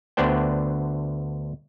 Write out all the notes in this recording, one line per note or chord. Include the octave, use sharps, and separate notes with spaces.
D2 D3 B3 D4 C5 G5